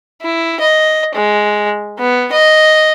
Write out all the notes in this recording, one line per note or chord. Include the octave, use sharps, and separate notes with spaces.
E4
D#5
G#3
B3
D#5